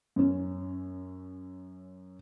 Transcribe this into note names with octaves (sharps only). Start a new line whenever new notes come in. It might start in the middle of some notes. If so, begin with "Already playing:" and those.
F#2 C#4